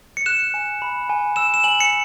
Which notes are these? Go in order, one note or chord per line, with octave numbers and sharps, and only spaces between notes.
C#7
F#6 E7
G#5
B5
G#5
E6 E7
E7
G#5 F#7
C#7